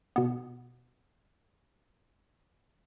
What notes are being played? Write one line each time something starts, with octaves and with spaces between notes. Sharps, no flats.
B2 B3